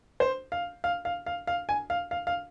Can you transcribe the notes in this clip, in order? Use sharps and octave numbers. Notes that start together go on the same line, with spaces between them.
C5
F5
F5
F5
F5
F5
G#5
F5
F5
F5